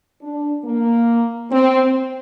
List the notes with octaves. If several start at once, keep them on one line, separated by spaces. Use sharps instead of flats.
D4
A#3
C4